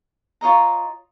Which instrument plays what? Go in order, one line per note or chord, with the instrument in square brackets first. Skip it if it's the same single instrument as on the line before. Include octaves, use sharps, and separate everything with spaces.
[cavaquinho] F4 C#5 D#5 A#5